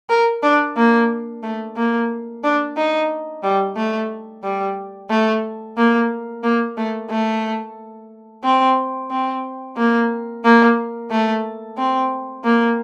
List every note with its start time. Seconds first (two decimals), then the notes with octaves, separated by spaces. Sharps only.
0.09 A#4
0.43 D4
0.77 A#3
1.43 A3
1.77 A#3
2.44 D4
2.77 D#4
3.43 G3
3.76 A3
4.43 G3
5.10 A3
5.77 A#3
6.43 A#3
6.77 A3
7.10 A3
8.44 C4
9.11 C4
9.77 A#3
10.44 A#3
11.10 A3
11.78 C4
12.44 A#3